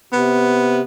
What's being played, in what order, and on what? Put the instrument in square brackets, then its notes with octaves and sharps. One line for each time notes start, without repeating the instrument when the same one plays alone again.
[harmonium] C3 [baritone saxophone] B3